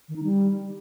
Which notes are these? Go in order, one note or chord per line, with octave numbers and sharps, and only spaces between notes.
D#3
D#4
G3